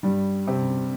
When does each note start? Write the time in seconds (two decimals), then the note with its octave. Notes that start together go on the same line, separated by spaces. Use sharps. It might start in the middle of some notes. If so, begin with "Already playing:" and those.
0.03 G2 G3
0.47 C3 C4